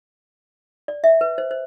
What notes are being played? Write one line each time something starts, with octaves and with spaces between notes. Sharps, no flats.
D5
E5
B4
C5
C5